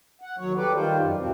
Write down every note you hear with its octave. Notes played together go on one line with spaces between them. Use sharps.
F#5
D#2 F#3 C#5
G3 A4 B4 D5
D#3 G3 F4 C5
F#2
E2 G#2 B2 F3 C4